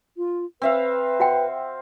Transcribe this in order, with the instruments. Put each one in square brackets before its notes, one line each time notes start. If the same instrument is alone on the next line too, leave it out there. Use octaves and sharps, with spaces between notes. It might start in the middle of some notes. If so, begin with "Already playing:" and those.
[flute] F4
[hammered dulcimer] C4 E5 F5 [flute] B4
[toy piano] F#4 F#5 G5